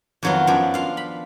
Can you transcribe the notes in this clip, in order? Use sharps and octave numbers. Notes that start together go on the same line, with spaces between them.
F2 D#3 F#3 B3 F4
F#2 F3 D4
F4 F5
B5